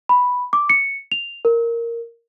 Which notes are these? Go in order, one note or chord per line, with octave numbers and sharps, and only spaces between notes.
B5
D6
C#7
F7
A#4